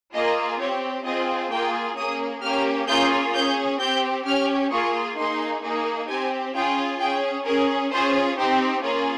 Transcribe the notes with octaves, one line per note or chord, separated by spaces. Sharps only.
A#3 F4 G#4 D#5
C4 G4 C#5
C4 F4 G#4 D#5
A#3 F4 G#4 G5
A#3 C#4 G#4 D#6
A#3 C#4 G4 F6
A#3 C#4 F4 G#4 G6
C#4 G#4 G6
C4 G4 G6
C#4 G4 F6
A#3 F4 G#4 C#6
A#3 D#4 G#4 C6
A#3 D#4 G#4
C4 G4 G#5
C#4 F4 G#4 G5
C#4 G#4 G5
C#4 G#4 A#4
C#4 F4 G#4 C5
C4 D#4 G4 C5
A#3 C#4 F4 G#4 A#4